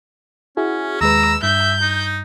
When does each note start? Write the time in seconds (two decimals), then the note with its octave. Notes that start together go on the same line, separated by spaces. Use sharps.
0.57 C#4 E4 F#4 G#4
1.01 D#2 G#3 B4 A#5 E6
1.43 G2 E5 G6
1.82 D#4